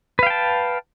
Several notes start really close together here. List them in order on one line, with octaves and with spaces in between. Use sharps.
B4 F5 G5 A5